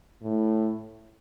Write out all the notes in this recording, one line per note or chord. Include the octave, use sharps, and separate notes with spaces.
A2